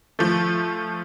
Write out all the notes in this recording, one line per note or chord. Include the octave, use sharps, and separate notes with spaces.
F3 A3